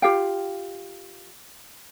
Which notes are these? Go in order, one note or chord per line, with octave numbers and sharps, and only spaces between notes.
F4 G4 F5 G5